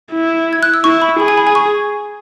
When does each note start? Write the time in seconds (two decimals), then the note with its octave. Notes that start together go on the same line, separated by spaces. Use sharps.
0.12 E4
0.53 G#6
0.63 F#6
0.74 E6
0.84 E4 C#6
1.02 B5
1.20 G#4 B5
1.28 G#5
1.37 B5
1.47 G#5
1.55 C#6